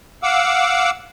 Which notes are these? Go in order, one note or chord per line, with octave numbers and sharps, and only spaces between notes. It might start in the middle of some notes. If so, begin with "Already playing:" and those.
F5 F#5 D6 E6